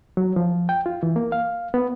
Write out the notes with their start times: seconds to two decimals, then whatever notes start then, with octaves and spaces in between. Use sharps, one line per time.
0.17 F#3
0.36 F3
0.69 G5
0.86 F4
1.03 E3
1.16 A#3
1.32 F5
1.74 B3